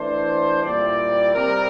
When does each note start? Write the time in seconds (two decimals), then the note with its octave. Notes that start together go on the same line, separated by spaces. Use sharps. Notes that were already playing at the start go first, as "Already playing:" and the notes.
Already playing: E3 A3 D4 C5
0.62 A#2 G3 C4 E4 D5
1.34 C3 G3 C4 A#4